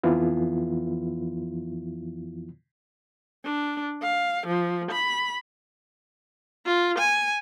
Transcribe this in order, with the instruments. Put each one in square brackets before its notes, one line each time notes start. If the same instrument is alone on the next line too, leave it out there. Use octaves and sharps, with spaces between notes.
[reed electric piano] F2 E3 F3 B3 E4 F4
[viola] D4
F5
F3
B5
F4
G#5